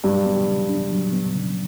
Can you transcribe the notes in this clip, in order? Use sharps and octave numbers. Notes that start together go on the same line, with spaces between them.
G2 F#3
B3
C#3
D4
F#3
B3
C#3